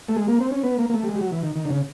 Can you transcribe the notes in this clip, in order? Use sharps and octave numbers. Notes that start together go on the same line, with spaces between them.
A3
G#3
A#3
C4
C#4
B3
A#3
A#3
A3
G3
G#3
G3
F#3
E3
D#3
D#3
D3
C#3